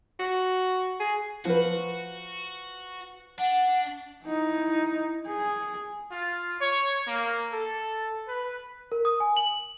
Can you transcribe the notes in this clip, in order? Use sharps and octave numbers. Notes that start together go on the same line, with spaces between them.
F#4
G#4
F3 F#4 B4
D4 F#5
D#4 E4
G#4
F4
C#5
A#3
A4
B4
A#4
D#6
G#5
F#7